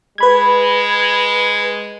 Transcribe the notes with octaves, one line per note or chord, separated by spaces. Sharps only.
G#3 B4 B5 G#6